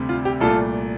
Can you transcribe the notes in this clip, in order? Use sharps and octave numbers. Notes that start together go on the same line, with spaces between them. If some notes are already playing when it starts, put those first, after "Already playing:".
Already playing: D2 C3 G3
F4
G4
C2 A#2 A3 F4 A4